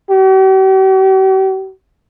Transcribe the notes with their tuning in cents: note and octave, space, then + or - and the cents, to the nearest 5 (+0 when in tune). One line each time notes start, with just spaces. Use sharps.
G4 -45